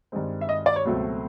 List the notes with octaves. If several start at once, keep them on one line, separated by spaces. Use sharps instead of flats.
G2 D#3 G#3 C4
E5
D#5
D5
C#5
C#2 B2 F#3 A3 C4